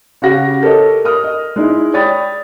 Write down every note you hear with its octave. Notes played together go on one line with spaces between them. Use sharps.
C#3 F#4 G4 F5 F#5 A#6
G4 A4 A#4 C#5 D#5
A#4 D#6 F6
D#5
G#3 D#4 E4
C#5 D5 G5 B5 D#6 A6